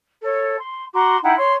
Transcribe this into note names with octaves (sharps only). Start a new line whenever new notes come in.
A4 C#5
C6
F#4 A#5 C6 D6
D#4 E4 F#5 G5
C#5 C6